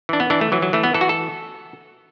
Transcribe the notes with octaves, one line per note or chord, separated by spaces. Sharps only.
E3 D4
B3
E3 D4
A3
E3 F#3
F#3
E3 A3
B3
E3 A4
F#4
A4